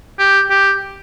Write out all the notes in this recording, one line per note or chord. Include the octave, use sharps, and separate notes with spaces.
G4
G4